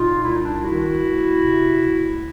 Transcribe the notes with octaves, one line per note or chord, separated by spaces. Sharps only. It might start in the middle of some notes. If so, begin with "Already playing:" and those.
Already playing: A#2 D#4 F4
C2 E4
D#4
D4 E4
D#3 E4 F#4
D2
C3
D2